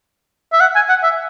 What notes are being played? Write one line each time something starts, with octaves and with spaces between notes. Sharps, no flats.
E5
F#5
G#5
F#5
E5